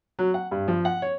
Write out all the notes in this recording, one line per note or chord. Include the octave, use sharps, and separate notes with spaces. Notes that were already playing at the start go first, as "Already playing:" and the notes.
F#3
F#5
G2
F3
F#5
C#5